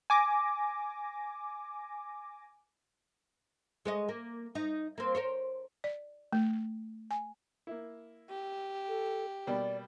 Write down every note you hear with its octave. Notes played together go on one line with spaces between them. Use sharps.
G#5 D6 A#6
G#3 C#5 D#5
A#3
D#4
A#3 C4
A#4 C5 C#5
D5
A3
G#5
A#3 E4
G4
A4
B2 G3 A#3 D5